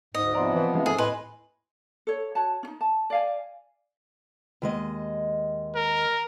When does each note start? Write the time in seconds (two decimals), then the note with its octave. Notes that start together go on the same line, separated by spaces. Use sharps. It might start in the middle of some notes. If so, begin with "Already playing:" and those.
0.14 D2 G#2 D#5
0.33 C3 F3 B3 D5 A#5 C6
0.55 E3
0.73 E3 G#3 F5
0.86 G#2 G#4 A4
0.98 D#2 A2 B4 D#5 G#5 C6
2.07 A4 C#5
2.35 F#4 C#5 A5
2.63 C#4 D#4
2.81 A5
3.10 D5 F5 G#5
4.62 D#2 G#3 D#5
5.75 A#4